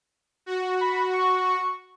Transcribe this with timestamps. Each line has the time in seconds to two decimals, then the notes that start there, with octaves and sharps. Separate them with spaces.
0.46 F#4
0.81 B5
1.13 C#6